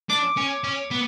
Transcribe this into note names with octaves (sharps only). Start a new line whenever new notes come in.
D4 D6
C#4
C#4
B3